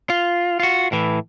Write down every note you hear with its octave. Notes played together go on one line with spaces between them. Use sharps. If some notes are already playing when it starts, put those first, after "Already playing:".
F4
F4 F#4
A2 E3